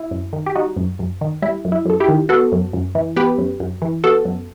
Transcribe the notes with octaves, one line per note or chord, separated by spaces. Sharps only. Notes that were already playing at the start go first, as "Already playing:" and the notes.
Already playing: E4
F#2
D#3
G4
G3 D#4 F#4
F#2
F#2
D#3
G3 E4
F#2
E4
F#2 A4
E4 G4
D#3
B3 F#4 A4
F#2
F#2
E3
B3 G4 B4
F#2
F#2
E3
B3 F#4 A4
F#2